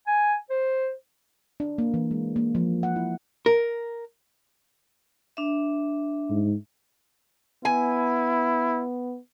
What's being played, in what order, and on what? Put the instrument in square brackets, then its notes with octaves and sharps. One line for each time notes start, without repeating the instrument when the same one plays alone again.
[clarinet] G#5
C5
[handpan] D4
A#3
E3
G#3
A#3
F3
F#5
E4
[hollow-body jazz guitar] A#4
[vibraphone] D4 E5
[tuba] G#2
[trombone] B3 [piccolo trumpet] E4 [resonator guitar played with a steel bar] G#5